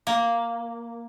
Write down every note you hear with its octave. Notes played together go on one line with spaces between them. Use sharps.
A#3